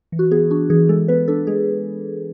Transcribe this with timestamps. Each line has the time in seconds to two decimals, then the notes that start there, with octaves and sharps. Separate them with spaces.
0.12 E3
0.19 F#4
0.31 B3 G#4
0.51 D4 F#4
0.70 E3 G#4
0.89 G#3 A4
1.08 B3 B4
1.28 D4 A4
1.47 G#3 G#4